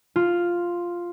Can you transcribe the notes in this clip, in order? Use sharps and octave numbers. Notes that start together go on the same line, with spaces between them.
F4